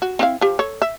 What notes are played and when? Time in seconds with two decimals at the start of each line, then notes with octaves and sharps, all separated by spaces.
0.02 F#4
0.19 C4 E4 F5
0.41 F3 G4
0.59 A4 C#5
0.82 E5